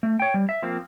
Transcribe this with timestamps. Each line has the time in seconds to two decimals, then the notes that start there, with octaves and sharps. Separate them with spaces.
0.03 A3
0.20 C#5 G5
0.34 G3
0.49 E5
0.62 F3 A#3 C4